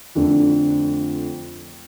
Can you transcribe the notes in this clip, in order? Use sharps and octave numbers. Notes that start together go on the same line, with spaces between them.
F2 D3 A3 D4